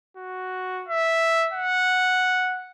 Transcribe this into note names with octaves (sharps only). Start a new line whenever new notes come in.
F#4
E5
F#5